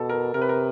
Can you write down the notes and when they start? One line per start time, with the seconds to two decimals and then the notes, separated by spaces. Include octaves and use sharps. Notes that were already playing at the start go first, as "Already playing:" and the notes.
Already playing: B2 A4
0.09 A#4
0.34 C3 A#4
0.42 B4
0.49 A#4